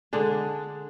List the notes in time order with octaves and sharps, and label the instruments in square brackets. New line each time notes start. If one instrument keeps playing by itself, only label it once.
[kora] D3 G#3 D4